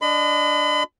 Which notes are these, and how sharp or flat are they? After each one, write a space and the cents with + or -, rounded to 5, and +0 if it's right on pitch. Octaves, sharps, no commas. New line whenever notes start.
D4 -5 D#5 -20 B5 +40